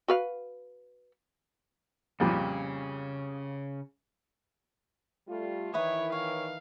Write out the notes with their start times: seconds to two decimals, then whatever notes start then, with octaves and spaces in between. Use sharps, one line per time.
0.08 F#4 B4 F5
2.20 F2 A#2 C#3 G3
5.28 G3 A3 F4
5.74 D#3 E3 E4 B4 C#5 D#6
6.12 C#5 F5